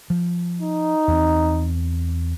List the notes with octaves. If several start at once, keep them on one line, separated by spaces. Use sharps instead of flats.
F3
D#4
E2 C4